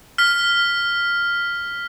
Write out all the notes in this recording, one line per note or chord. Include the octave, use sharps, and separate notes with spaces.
F6 B6